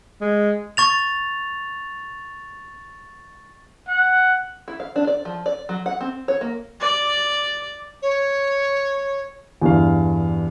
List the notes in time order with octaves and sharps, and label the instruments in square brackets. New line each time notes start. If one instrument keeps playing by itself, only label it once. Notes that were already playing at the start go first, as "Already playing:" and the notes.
[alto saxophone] G#3
[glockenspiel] C#6 A6 F7
[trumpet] F#5
[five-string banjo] E4
F5
D4
D5
F3
D5
F#3
F#5
C4
C#5
A#3
[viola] D5
[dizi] C#5
[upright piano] E2 G2 F5